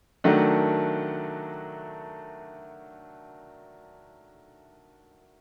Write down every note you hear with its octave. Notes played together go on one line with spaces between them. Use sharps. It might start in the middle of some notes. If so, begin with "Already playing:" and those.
D#3 F#3 A3 D4 F#4